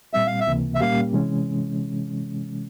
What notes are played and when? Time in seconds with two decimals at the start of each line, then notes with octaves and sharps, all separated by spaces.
0.14 A#2 G3 C4 E5
0.27 F5
0.40 E5
0.47 C#2 C3 E3 A#3
0.75 E5
0.81 A#2 G3 A#3 C#4 G4 F5
1.13 C3 E3 G#3 C#4